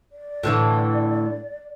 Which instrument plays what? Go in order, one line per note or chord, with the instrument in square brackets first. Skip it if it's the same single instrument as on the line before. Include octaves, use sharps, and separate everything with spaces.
[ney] D5
[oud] A2 D3 E3